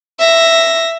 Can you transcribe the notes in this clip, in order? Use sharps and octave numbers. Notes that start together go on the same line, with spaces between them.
E5 A#6